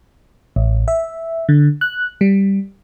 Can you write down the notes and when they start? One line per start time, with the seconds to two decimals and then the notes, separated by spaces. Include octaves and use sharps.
0.56 A1
0.88 E5
1.49 D3
1.81 F#6
2.21 G3